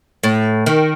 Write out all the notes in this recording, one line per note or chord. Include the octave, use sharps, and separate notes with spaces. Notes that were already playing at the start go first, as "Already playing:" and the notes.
A2
D#3